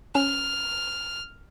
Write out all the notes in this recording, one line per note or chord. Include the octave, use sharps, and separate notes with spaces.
C#4 F6